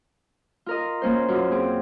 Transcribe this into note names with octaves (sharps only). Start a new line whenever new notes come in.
F4 A#4 D#5
A#3 C#4 C5
F#2 F4
C4 G#4